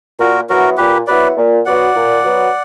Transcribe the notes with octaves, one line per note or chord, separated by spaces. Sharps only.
A#2 F#4 A#4
F#3 B3 E4 F#4 A#4
A#2 G4 B4
F#3 B3 E4 B4 D5
A#2
F#3 B3 F#4 D5 F#5
A#2
F#3 B3 F#4